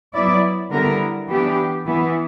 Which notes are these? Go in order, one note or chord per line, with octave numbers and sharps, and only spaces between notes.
F#3 B3 E4 D5
D3 G3 B3 E4 A#4
E3 B3 D4 G4
E3 B3 E4